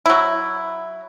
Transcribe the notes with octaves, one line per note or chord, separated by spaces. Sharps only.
F#3 E4